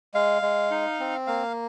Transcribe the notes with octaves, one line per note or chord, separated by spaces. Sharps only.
G#3 F5
G#3
D#4
C4
A#3 F5